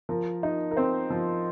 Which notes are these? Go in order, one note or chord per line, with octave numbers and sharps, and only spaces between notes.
F3 A#4
D#4
A#4
C4 C5
F3